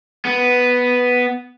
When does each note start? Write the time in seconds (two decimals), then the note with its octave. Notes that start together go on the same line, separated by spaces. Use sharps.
0.25 B3